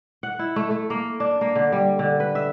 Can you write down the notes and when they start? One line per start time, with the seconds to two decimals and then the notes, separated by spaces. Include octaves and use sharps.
0.23 F#5
0.39 E4
0.56 A3
0.70 A3
0.90 A#3
1.20 D4
1.41 A#3
1.55 D3
1.72 G3
1.99 D3
2.20 B4
2.35 E5